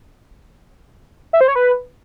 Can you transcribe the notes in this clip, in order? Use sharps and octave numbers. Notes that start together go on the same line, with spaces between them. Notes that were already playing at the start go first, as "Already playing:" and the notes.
E5
C5
C#5
B4